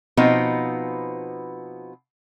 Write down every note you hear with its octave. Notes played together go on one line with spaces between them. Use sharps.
B2 F3 B3 C4 D#4